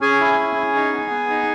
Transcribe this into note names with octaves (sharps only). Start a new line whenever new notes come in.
C#4 G#4 G#5
E4
C#4
C#4
D#4
B3
B3
D#4